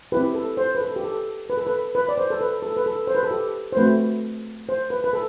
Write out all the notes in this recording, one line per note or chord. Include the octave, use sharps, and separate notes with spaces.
C4 E4 G4 B4
A4
C5
B4
A4
G4
A4
B4
A4
B4
B4
D5
C5
A4
B4
A4
B4
A4
C5
B4
A4
G4
C5
A3 C4 F#4 B4
C5
B4
B4
A4